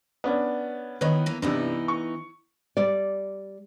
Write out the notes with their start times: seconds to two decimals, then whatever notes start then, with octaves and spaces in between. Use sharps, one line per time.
0.24 B3 C#4 D4
1.01 D#3 E3 B3 B4 C#5 D#5
1.26 E3 A#3
1.42 G2 C3 E3 B3 D#4
1.88 C#6
2.77 G3 D5